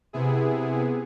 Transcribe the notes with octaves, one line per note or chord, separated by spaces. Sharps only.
C3 B3 E4 G#4